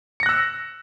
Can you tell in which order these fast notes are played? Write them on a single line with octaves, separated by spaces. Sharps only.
C#7 A#6 F#6 E6